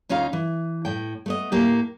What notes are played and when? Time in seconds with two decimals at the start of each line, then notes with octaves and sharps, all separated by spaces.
0.09 D2 C#4 D#4 F4 F5
0.33 E3
0.85 A2 G5
1.26 A3 B3 D#5
1.52 A2 A#3 G4